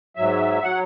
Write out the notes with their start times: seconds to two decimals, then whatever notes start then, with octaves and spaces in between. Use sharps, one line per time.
0.16 G#2 F#3 E5
0.63 F#3 F#5